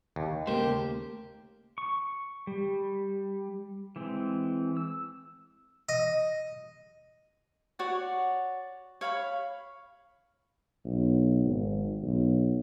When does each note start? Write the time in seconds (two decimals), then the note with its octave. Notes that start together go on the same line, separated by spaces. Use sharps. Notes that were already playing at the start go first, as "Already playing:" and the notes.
0.16 D#2
0.47 C#3 A3 A#3 G4 C5
1.78 C#6
2.47 G3
3.96 E3 G#3 C4
4.77 E6
5.89 D#5
7.79 F#4 C#5 D5 F#5
9.01 C#5 F5 B5 C#6
10.85 B1
11.44 G#1
12.03 B1